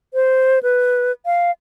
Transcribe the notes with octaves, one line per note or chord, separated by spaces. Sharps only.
C5
B4
F5